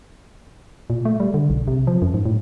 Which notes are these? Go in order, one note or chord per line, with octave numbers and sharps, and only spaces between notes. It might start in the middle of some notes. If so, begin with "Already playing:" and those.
A#2
A3
G3
D3
B1
C3
F3
F#2
G#2
A2